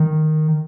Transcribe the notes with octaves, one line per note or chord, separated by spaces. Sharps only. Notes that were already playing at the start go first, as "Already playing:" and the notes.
Already playing: D#3